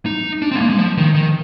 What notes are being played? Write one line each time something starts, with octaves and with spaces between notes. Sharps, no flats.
D#4
D4
C4
G#3
A#3
G#3
F3
D#3
D#3